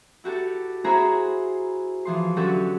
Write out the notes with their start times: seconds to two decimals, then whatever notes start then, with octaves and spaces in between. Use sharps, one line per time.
0.24 E4 F#4 G4 A4
0.84 E4 F#4 G#4 C5 A#5 B5
2.05 E3 F3 C6
2.36 D3 F#3 C#4 F#4 G4 A4